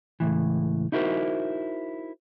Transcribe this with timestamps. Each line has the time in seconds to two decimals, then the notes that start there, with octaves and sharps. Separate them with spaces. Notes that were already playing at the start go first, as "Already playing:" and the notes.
0.20 C#2 A2 E3
0.92 D#4 E4 F#4 A#4 C5